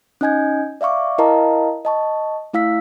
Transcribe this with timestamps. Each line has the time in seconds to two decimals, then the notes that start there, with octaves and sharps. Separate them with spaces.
0.21 C#4 D#4 D#5 G#5 G6 G#6
0.81 D5 E5 F5 C#6 D6
1.18 E4 A#4 D#5 F5 A5 A#5
1.85 D#5 A5 C#6
2.53 A3 E4 F5 E6 B6